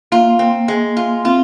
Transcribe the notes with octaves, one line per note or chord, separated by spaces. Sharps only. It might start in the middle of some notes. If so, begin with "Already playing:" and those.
A#3 F4
C4
G#3
F4
C4 F4